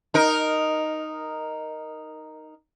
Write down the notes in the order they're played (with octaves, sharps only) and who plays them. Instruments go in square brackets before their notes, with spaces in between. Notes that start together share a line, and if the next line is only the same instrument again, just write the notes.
[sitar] D#4 A#4